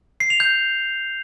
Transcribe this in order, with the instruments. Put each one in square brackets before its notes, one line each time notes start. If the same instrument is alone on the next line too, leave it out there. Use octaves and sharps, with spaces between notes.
[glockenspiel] C7
F7
G6